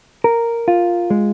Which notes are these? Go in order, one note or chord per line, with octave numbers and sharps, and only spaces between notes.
A#4
F4
G#3